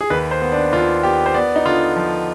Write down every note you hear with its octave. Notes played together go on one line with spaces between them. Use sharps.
G#4
D#2 B4
C5
B3
D4
D#2 F4
B3 G4
C5
B3 D5
D#4
D3 F4
F3